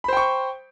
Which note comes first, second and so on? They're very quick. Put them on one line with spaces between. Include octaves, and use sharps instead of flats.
B5 C5 G5 C#6